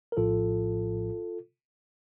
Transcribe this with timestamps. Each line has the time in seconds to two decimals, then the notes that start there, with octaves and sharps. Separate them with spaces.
0.12 A#4
0.17 A#1 A2 F3 F4 A4